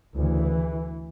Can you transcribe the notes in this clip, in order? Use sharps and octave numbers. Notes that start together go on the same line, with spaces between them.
D2 C#3 E3